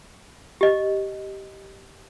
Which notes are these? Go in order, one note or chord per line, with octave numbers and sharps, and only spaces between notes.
G4 D#5